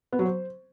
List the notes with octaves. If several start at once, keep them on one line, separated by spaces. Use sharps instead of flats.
B3
F#3
C5